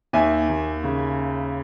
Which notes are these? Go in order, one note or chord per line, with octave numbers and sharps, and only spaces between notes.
D#2 E5 G#5
D#2
C#3